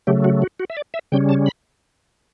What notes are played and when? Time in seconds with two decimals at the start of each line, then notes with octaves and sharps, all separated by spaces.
0.07 C#3 F#3 A3 G4
0.24 F#4
0.42 F#4
0.60 F#4
0.70 E5
0.77 D5
0.94 E5
1.12 C#3 G3 C#4 G5
1.29 A5
1.46 B5